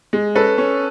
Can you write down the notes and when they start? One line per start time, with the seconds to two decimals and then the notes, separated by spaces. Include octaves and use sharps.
0.13 G#3
0.35 C#4 A4 B4
0.58 C#4